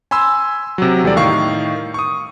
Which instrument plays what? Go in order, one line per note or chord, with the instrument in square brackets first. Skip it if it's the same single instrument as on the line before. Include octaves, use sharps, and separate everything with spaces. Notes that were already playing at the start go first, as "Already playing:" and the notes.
[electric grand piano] G#5 B5 C6 E6
C3 F#3
E2 G3 A4 D5
A2 D#3 F5 C#6 C7
C#6 D#6